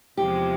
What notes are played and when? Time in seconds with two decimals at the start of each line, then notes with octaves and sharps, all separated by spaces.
0.17 E2 C3 F3 G#3 G4